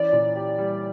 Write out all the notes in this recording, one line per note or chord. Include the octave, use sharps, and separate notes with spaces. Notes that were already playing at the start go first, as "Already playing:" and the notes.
Already playing: E3 C#4 D5
A#2
G4
G3